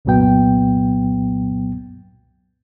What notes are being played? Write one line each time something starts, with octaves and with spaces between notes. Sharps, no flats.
C2 F#2 A#2 F#3 B3 G5